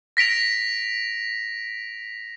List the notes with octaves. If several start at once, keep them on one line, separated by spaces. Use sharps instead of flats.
A#6 B6 D7 F7